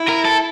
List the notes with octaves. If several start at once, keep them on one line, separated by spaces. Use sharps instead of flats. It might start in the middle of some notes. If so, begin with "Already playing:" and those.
Already playing: E4
A#4
A4